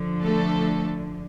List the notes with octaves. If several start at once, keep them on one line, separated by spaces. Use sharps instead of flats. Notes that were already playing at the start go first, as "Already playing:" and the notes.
Already playing: D3 F3
A3 A4